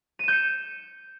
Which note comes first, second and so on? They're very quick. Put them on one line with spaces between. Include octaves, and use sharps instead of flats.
D#7 E7 G6 C#7